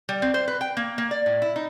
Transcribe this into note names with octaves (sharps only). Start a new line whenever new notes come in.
G3
C4
C5
B4
G5
A#3
A#3
D5
A2
E4
D#4